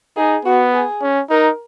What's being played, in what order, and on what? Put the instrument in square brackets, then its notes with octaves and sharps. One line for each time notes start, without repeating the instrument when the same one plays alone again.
[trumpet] D#4 [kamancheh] G#4
[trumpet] B3 [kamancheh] F#4
[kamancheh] G#4
[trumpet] C#4
[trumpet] D#4 [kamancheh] A#4